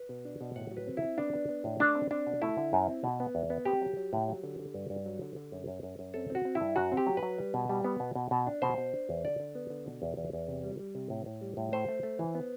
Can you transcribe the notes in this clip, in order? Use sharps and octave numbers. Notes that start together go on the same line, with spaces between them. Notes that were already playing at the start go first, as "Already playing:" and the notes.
Already playing: B4
B2
D4
B2
A2 F#5
F#3
B4
C4
E4
C4
B3 D4
B3
B3
A2
A3 D4
C4
C4 D4
B2
A3 E4
D3
F#2
C4
B2
B3
E2
B3
C4 G4
F#3
F#3
A2
F#3
D3
D3
G2
G2
F#3
D3
D3
F#2
F#2
F#2
F#2
C4 A4
C4
F#4
C4
E4
G2
F#2 F#4
C4
G4
F#3
B4
F#3
G3
B2
G3
B3
B2
B2
B2
D4
B2 C5
B2
D4
E2
D3 D5
D3
B3
D3
B2
E2
E2
E2
C3
G3
G3
C3
A2
A2
G3
A2
A3 C5
A3
A3
E3
B3